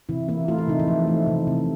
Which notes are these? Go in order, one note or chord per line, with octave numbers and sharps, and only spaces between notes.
C3 E3 E4
E3 A#3 E4
A3 F4
E4
C3 D#4
E3 E4
F3
A3
C3
C3